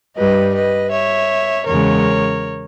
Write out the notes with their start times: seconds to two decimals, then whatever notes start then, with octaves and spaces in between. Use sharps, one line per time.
0.17 G2 G3 B4 D#5
0.54 B4 D#5
0.91 C#5 E5
1.66 E2 C#3 G#3 A#4 C#5